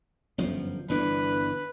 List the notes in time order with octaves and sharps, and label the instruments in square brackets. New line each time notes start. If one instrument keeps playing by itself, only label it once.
[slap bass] G1 F#2 F3
[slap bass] G1 E3 D4 [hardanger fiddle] B4